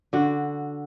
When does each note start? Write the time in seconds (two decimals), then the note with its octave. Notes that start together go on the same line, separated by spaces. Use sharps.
0.13 D3 F#4